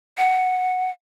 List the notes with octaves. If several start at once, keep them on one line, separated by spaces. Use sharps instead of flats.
F#5